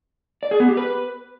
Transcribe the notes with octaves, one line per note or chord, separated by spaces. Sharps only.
D5
G#4
B3
G4
B4